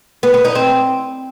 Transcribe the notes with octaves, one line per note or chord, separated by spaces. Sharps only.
B3
B3
D#4
C4